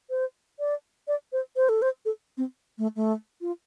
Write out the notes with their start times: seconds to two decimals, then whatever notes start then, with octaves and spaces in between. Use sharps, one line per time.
0.10 C5
0.59 D5
1.08 D5
1.32 C5
1.56 C5
1.69 A4
1.82 C5
2.05 A4
2.37 C4
2.78 A3
2.96 A3
3.41 F4